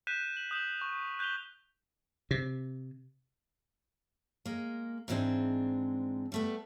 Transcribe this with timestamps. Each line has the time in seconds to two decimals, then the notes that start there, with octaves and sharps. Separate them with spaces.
0.07 F#6 G6 B6 D#7 E7
0.37 F#7
0.51 D#6 G6 E7 F#7
0.81 C#6
1.19 F#6 G6 B6 F7 G7
2.31 C3
4.46 G#3 A#3
5.08 G#2 E3 G#3 A#3 C4 D4
6.32 G3 A3 B3